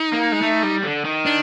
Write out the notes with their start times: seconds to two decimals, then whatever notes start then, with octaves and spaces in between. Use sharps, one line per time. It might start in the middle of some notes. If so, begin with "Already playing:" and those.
Already playing: D#4
0.13 A#3
0.32 G#3
0.42 A3
0.63 G3
0.83 D3
1.05 D#3
1.26 D4